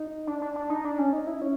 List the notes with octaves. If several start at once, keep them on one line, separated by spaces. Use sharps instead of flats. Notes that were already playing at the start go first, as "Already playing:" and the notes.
Already playing: D#4
D4
D4
D4
D#4
D4
C#4
D#4
E4
C#4